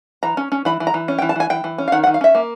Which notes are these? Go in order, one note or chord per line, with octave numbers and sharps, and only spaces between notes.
E3 A#5
C#4
C#4
E3 B5
E3
A#5
E3
C#4
G5
E3
A5
E3 G#5
E3 G5
E3
C#4
F5
D#3 F#5
F#5
D#3
F5
C#4 E5
A#3